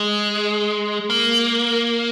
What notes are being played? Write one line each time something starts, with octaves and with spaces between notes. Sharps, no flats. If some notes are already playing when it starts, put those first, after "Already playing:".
Already playing: G#3
A#3